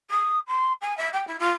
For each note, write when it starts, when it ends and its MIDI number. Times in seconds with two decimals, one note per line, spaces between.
0.10 0.39 87
0.47 0.72 84
0.81 0.96 80
0.97 1.09 76
1.13 1.25 79
1.27 1.37 64
1.39 1.50 65